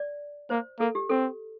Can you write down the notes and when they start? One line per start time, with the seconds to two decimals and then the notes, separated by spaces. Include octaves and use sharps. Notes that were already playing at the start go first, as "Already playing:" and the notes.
Already playing: D5
0.50 A#3 C5
0.79 A#3 A4
0.95 G4
1.09 C4 A4